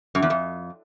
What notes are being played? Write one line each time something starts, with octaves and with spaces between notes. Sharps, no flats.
F#2
E2
F2